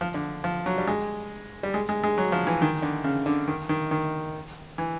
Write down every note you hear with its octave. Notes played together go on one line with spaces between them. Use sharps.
F3
D3
F3
F#3
G3
G#3
G3
G#3
G#3
G#3
F#3
F3
E3
D#3
D3
C#3
D3
D#3
D#3
D#3
E3